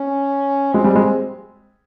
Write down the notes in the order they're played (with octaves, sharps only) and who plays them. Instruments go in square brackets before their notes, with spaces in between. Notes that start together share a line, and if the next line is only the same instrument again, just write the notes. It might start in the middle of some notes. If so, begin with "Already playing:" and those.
Already playing: [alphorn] C#4
[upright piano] G#3 [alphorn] C4
[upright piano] G3
G#3